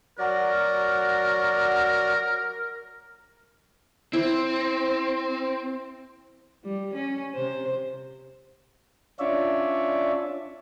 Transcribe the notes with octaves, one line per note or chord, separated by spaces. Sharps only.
F#3 F#4 A#4 D5
C4 E4
G3
C#4
C3 C5
C#4 D4 F4 C#5 D5 E5